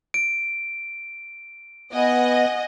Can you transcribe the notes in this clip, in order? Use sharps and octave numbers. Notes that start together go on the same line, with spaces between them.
D7
B3 D#5 F#5 G#5